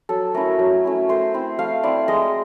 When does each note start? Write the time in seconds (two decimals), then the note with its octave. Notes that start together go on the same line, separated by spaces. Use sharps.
0.09 F#3 A4
0.34 A3 C#4 E4 A#4
0.59 F#3
0.84 A3 C#4 E4
1.09 A3 C5
1.34 C4 E4
1.59 A3 F5
1.83 C4 E4 D5
2.08 G#3 D#5